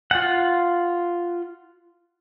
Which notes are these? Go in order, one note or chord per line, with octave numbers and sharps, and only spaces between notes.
F4 F#5